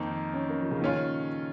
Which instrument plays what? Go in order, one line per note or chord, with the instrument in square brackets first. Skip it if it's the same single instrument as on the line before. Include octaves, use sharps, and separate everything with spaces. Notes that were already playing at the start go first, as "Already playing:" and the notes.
Already playing: [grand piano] F2 D#3 A#3 D#4
[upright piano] C#4
A#3
F3
C#3
[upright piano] A#2 [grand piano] D#3 C#4 F4